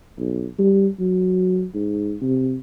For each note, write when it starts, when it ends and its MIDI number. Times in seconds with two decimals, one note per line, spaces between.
0.18 0.47 35
0.59 0.88 55
1.00 1.65 54
1.74 2.16 44
2.22 2.57 48